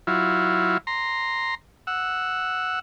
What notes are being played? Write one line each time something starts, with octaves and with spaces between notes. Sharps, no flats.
F#3 E4 F4
A#5 C6
F#5 E6